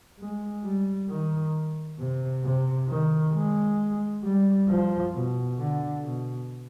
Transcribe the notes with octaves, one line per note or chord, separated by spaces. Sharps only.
G#3
G3
D#3
C3
C3
D#3
G#3
G3
F3
B2
D3
B2